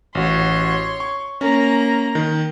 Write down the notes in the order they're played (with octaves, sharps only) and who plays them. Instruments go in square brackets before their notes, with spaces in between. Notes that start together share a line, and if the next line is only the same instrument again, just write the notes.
[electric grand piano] A1 F#4 [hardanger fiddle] C#5 C6
[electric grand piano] C#6
[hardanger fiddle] A#3 A#5 [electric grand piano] C#4
[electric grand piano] D#3